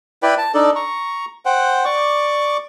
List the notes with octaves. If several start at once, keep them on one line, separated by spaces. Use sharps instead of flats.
E4 B4 D5 G5
A5
D4 D#4 A4 D5
A#5 C#6
C5 F#5 G5
D5 C#6 D6